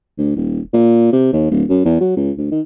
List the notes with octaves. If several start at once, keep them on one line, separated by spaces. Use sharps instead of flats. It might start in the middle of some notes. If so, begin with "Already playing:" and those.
D2
D#1
A#2
C3
D#2
D1
F#2
E2
F#3
C#2
D2
D#3